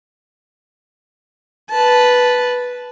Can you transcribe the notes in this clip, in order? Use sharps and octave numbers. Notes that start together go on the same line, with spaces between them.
B4 A5